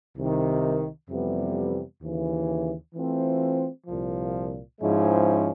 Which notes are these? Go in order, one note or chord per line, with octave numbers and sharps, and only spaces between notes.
C2 C3 D#3
F2 C3 E3 G3 B3
D#2 C#3 E3
E3 A3 C4 F4
C2 A#2 F3
G#2 F3 G#3 C#4 E4